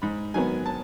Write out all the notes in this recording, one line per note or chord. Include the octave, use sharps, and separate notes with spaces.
G#2 B5
D#3 F#3 B3 G#5
A5